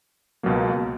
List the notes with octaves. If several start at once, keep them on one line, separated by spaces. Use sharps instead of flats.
C#2 B2 F#3 A#3